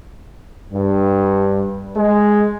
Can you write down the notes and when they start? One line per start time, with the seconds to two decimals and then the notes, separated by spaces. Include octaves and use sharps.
0.73 G2
1.97 G#3